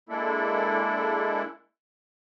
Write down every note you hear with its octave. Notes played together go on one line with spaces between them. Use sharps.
G#3 A#3 D4 E4 A4